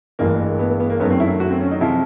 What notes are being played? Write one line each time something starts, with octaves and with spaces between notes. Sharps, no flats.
A1 G2 E3 G#3 A#3
B3
B3
B3
A#3
F#2 D#3 F#3 A3 B3
C4
E4
F#4
C4
C#4
D#4
C3 F3 G#3 E4